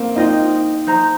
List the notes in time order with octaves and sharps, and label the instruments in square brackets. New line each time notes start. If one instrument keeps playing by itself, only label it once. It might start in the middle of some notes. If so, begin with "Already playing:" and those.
Already playing: [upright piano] A#3 C4
[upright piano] D#4 [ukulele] F4 C5 D#5 G5
[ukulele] D#4 C5 D#5 A#5